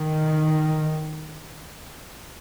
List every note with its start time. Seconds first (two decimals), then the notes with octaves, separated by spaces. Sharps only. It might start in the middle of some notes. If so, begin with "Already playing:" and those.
Already playing: D#3